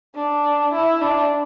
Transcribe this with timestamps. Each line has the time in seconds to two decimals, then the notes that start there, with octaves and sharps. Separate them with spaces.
0.15 D4
0.73 E4
1.01 D4